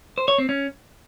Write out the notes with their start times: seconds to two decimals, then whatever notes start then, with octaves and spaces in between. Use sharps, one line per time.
0.18 C5
0.28 C#5
0.38 C4
0.49 C#4